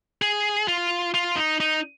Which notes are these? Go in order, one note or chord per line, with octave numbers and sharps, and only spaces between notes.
G#4
F4
F4
D#4
D#4